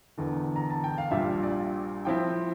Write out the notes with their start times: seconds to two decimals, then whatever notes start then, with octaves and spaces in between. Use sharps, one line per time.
0.18 E1 E2 D3
0.56 A#5
0.70 A5
0.84 G5
0.98 F5
1.11 A#1 A#2 G3 D4 F4 E5
1.43 D5
2.05 A2 F3 C4 E4 G5